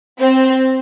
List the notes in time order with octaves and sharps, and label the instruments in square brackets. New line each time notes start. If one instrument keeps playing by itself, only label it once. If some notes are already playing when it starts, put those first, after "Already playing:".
[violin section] C4